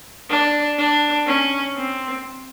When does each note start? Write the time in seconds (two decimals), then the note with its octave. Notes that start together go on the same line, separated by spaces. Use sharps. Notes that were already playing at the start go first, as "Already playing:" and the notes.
0.29 D4
0.78 D4
1.26 C#4
1.75 C4